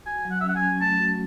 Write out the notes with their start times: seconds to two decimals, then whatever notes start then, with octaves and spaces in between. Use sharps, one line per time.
0.06 F#4 G#5
0.25 F#3
0.31 F#5
0.41 E5
0.44 C#4
0.49 F#5
0.56 G#5
0.62 C#4
0.81 A3 A5
1.00 F#4